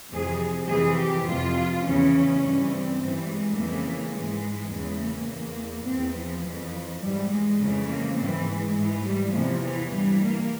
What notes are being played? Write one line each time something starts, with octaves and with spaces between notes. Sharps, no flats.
F2 C3 E3 G#4
F2 C3 E3 G#4
G4
F2 C3 E3 F4
E2 C#3 E3 C#4
G2 E3
C4
G2 E3
G#3
F2 C#3 E3 A#3
G#2 E3 G#3
E2 C#3 E3 G#3
A#3
E2 E3
E2 E3 C4
F3
F2 E3 F3
G#2 E3 G3
G#3
F2 C#3 E3
A#3
G#2 E3 C4
G#3
G#2 E3
G3
E2 C3 E3 F3
E3
G2 E3 G3
A#3